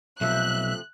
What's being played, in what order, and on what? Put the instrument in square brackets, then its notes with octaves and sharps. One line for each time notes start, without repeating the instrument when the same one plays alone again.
[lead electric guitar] B1 [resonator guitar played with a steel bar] C3 F3 A3 [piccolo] E5 [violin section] F#6